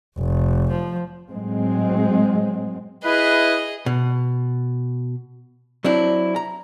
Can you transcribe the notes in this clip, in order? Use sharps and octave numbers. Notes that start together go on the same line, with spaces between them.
F1
F3
A2 F#3 G#3 C4
E4 G#4 B4 D#5
B2
F#3 C4 D4 E4
A#5